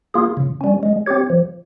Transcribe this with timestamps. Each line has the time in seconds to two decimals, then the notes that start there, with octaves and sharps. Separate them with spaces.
0.14 A#3 F4 G#4
0.37 C#3
0.61 G3 C#4
0.83 G#3
1.06 C4 G4 C#5
1.30 F3